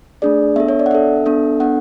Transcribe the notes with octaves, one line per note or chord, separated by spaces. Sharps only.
A3 D4 G#4 D5
B3 D4 A4 E5
C#5
D5
F#5
B3 D4 A4 E5
B3 D4 A4
B3 D4 A4 F#5